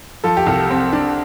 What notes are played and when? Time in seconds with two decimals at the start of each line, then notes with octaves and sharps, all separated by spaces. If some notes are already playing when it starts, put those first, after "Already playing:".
0.24 F3 A4
0.37 G4
0.47 C2 A4
0.70 C4
0.93 D4